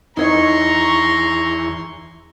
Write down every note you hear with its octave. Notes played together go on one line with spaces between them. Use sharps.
E2 D#4 C#5 D#5 A#5 C6 C#6